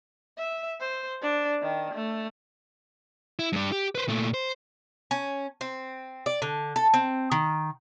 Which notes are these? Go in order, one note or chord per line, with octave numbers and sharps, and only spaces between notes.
E5
C5
D4
D#3
A3
E4
G2 G3
G4
B4 C5
A#2 A3
C5
C#4
C4
D5
D3
A4
C4
D#3